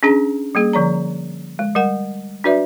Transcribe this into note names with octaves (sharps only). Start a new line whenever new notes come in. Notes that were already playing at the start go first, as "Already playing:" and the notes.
C#4 D4 G#4 A#5
G3 A#3 G#4
D3 F3 D5 A#5
G#3
G3 A#4 F#5
D4 F#4 B4 D5 E5